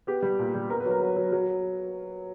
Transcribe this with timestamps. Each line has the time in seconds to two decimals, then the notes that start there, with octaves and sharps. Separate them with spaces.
0.07 B3 G4
0.23 G3
0.39 A#2
0.55 G3
0.70 B3 A#4
0.80 B4
0.86 F#3
0.91 A#4
1.01 F#3
1.16 F#3
1.33 F#3